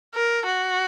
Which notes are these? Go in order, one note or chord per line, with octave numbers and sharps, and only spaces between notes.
A#4
F#4